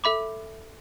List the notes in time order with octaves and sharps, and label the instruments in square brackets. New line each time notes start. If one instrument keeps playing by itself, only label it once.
[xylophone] A4 E5 B5 D6